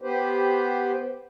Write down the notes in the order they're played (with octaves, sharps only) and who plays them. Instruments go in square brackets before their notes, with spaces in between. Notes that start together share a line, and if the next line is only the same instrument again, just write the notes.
[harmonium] B3 G4 B4 C5